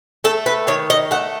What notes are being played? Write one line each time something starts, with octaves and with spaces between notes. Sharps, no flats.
A3 A4
B4
D#3 C#5
D#5
A3 F#5